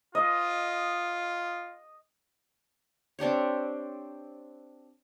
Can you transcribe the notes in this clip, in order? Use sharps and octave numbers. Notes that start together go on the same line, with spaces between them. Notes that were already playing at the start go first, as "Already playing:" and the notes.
F4 D#5
C4 D4 G4 C#5